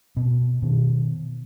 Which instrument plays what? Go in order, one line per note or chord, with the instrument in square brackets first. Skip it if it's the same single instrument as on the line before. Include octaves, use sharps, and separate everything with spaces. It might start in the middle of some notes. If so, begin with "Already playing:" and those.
[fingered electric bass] B2
B2 D#3